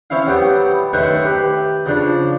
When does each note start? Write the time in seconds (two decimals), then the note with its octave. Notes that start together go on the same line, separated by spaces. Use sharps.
0.10 C4 C#4 E4 F5
0.26 F#3 G3 B3 G5
0.93 F#2 D#3 A3 B4 C5 C#6
1.24 G4 B4
1.86 C#3 F3 D4